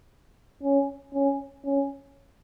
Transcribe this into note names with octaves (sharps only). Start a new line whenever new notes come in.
C#4
C#4
C#4